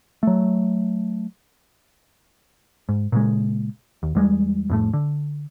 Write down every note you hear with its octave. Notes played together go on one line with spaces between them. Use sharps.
F#3 A3
G#2
A#2 C#3 G#3
D#2
E2 G3 G#3
F2 A2 A3
D3